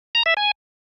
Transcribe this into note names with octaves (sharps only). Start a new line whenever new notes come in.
A#5
E5
G#5